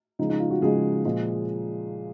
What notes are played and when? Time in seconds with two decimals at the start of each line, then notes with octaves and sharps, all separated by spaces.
0.19 C#3 F3 G#3 D#4
0.29 D#4
0.40 F4
0.50 F#4
0.62 C#3 F3 G#3 G#4
1.05 A#2 F3 G#3